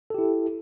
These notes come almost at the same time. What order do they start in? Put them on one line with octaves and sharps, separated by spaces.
A4 G4 E4